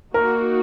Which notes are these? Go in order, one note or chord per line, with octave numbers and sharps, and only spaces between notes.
A#3 D#4 F#4 A#4